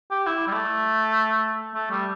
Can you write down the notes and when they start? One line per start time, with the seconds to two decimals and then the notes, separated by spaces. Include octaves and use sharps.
0.11 G4
0.27 E4
0.47 G3
0.52 A3
1.74 A3
1.91 G3